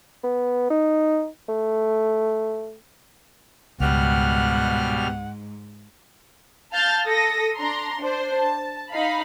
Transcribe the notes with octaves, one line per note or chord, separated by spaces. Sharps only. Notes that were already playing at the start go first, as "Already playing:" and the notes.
B3
D#4
A3
C#2 G#2 B2 G3 F#5 F6
F5 A5 F6 G6 A6
A4 D#6 A#6
D4 A#5 C6
D4 C5
A5
D#4 F5 B5